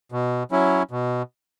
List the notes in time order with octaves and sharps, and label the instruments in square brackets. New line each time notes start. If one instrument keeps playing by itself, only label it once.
[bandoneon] B2
F#3 C#4 E4
B2